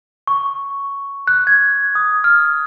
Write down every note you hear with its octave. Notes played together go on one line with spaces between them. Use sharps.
C#6
F#6
G#6
D#6
F6